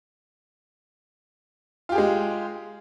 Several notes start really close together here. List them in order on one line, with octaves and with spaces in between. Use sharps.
F4 G4 G#4 G#3